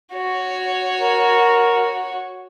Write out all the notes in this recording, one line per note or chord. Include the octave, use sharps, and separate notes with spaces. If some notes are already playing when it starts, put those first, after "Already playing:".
F#4 C#5
A#4